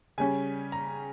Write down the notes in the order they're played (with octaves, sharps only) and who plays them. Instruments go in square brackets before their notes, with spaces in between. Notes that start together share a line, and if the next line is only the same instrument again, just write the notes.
[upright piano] C#3 G3 C#4 G#5
A#5